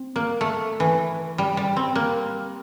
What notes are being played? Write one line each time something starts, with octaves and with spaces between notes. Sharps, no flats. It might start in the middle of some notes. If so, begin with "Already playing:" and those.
Already playing: C4
A#3
A3
E3
G3
G3
C4
A#3